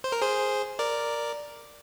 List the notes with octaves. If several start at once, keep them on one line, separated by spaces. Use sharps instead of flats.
C5
A#4
G#4 C5
A#4 D5